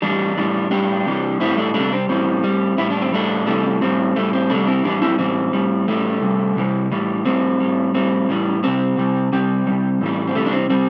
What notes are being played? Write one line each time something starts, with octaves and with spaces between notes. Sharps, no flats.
A2 E3 G3 D4 G4
A2 E3 G3
A2 G3 D4 G4
C3 E3 G3
A2 E3 G3 C4 E4
A3 D4
C3 G3 A3 D4
C4
A2 E3 G3 C4
A2 G3
A2 E3 G3 E4
D4
C4
A2 G3 A3 D4
C3 E3 G3 A3
A2 G3 C4
A2 G3 A3
C4
C3 G3 A3 D4
C4 E4
A2 E3 G3 D4 G4
C4 E4
A2 E3 G3 C4
A2 G3
A2 E3 G3 A3
C3 G3
C3 E3 G3
A2 E3 G3
A2 G3 C4
A2 G3
A2 G3 C4
A2 E3 G3
C3 G3 C4
C3 G3
C3 G3 C4
C3 G3
A2 E3 G3
C4
C3 E3 G3 A3
D4
C4
C3 G3 C4